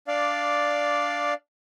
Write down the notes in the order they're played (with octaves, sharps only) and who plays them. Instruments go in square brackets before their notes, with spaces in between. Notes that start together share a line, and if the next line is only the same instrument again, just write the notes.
[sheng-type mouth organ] D4 D5 F5